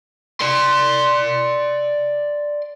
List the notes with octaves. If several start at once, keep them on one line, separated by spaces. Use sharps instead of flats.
D5 C6